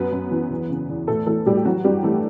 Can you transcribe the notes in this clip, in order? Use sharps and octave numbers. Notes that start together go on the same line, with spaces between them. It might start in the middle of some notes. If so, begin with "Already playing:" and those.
Already playing: F#2 B3 B4
F#2
E3
E2
C#3
E2
A2 A3 A4
E3 A3 A4
A2 G3 G4
G4
E3 F#3 F#4
G2 G3 G4
E3 A3 A4